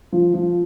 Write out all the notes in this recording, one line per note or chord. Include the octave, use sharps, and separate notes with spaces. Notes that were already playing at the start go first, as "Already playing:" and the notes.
F3
F3